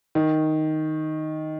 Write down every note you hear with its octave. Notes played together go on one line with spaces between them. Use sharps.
D#3